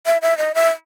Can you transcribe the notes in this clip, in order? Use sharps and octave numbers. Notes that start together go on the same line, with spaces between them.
E5
E5
D#5
E5